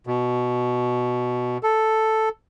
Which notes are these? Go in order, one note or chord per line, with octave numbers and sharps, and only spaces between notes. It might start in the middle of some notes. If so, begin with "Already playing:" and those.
B2
A4